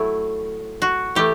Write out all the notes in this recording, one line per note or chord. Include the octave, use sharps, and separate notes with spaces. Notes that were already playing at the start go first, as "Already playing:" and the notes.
Already playing: F#3 A3 E4
F#4
E3 A3 G4